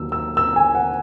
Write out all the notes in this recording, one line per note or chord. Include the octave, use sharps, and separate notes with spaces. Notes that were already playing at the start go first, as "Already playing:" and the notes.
Already playing: D#2 D#3 F#3 E6
E6
E6
G#5
F#5